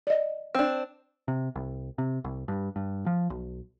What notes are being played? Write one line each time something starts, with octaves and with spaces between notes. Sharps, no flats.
D5 D#5
C4 D4
C3
C2
C3
C2
G2
G2
F3
B1